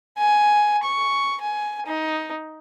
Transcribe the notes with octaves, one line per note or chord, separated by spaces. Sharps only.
G#5
C#6
G#5
D#4